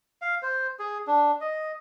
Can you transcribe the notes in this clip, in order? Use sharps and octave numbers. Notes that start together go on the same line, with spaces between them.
F5
C5
G#4
D4
D#5